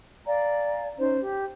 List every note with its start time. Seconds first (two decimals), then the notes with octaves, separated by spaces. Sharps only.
0.26 D5 F5 G#5 A#5
0.98 C#4 D#4 C5
1.20 G4